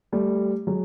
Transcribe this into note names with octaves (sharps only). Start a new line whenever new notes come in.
G3 A3
F#3 G#3